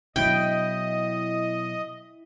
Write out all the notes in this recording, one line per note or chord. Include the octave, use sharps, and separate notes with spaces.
B2 F#3 E4 D#5 G5